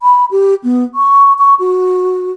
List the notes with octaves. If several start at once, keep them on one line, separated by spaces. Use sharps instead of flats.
B5
G4
B3
C#6
C#6
F#4